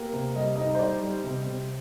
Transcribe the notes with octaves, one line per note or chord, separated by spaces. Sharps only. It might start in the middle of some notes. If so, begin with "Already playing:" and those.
Already playing: A#3 G4
C3
G3 D#5
D#4 D#5
C5
G3 D5
G3
C3
C3